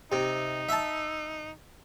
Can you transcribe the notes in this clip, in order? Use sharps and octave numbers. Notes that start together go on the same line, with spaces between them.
C3 D#4
E5 A5